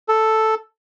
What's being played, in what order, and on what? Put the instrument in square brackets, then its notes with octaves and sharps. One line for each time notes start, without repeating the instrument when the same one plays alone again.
[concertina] A4